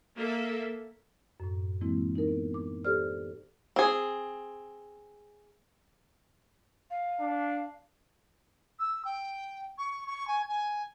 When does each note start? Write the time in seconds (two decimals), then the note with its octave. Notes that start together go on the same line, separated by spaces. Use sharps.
0.18 A#3 A4 E5
1.40 F#2 A2
1.81 E3 G#3 A#3 C4 E4
2.15 D#4 A#4
2.28 B3
2.54 D6
2.85 G4 A4 C5 D5 F6
3.76 C4 G#4
6.90 F5
7.20 D4
8.79 E6
9.05 G5
9.78 C#6
10.07 C#6
10.27 G#5
10.49 G#5